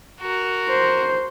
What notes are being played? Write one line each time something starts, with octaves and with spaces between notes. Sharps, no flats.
F#4 A#4
C5